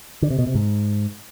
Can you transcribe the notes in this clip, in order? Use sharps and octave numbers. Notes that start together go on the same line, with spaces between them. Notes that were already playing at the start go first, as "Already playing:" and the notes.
D3
C3
B2
C3
G#2